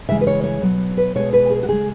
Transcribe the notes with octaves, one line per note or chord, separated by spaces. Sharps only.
C#3 E3 G#3 E5
B4
C#5
C#5
B2 F#3
B4
B2 G#3 C#5
B4
G#4
F#4
C#3 G#3 G#4